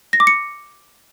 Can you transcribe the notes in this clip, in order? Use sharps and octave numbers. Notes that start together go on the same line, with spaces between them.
A#6
D6
C#7